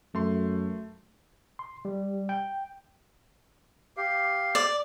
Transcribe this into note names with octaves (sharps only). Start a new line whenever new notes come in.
F#2 A3 C6
C6
G3
G5
G4 F5
D5